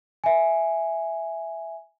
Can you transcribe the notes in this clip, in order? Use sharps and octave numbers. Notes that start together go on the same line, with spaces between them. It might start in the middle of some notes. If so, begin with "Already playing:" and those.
E5 G#5